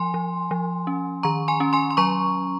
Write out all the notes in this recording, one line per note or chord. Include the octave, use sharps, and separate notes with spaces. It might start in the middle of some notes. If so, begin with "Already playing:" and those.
Already playing: F3 G#5 C6
F3
F3
C#4
D#3 A#5 C#6
G#5 C6
C#4
G#5 C6
C6
F#3 A#5 C#6